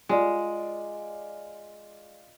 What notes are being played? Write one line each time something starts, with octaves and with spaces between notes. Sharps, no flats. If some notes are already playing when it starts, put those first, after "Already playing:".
G#3 F4 D5